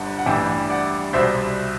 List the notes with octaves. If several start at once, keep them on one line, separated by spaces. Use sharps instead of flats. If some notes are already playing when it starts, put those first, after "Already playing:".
Already playing: G1 G2 D3 F#5 A5
F#5
A1 G2 E3 G3 E5 G5
D5 F#5
C2 B2 G3 C5 E5